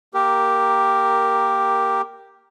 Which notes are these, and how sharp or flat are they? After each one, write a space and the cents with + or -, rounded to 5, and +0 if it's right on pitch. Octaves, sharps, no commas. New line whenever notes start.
A#3 +0 G4 +0 A#4 -5